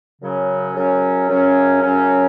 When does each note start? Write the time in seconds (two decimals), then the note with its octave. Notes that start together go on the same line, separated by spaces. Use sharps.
0.20 F#2 C#3 F#3 C#4
0.75 F#2 C#3 F#3 C#4
1.29 F#2 C#3 F#3 C#4
1.82 F#2 C#3 F#3 C#4